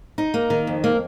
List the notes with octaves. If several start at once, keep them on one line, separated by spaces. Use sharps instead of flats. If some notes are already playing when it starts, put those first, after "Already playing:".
D#4
A#3
D#3
F2
A#3